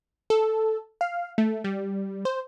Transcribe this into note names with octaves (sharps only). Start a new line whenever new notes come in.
A4
F5
A3
G3
C5